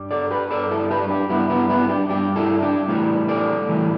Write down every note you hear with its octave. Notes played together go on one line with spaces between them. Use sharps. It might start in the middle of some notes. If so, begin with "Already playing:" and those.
Already playing: G2 G3
A4 D5
G4 B4
G2 G3 A4 D5
E4 A4
G4 B4
D4 G4
G2 G3 B3 E4
B3 E4
B3 E4
D4 G4
G2 G3 D4 G4
E4 A4
D4 G4
A2 E3 G3
A4 D5
A2 E3 G3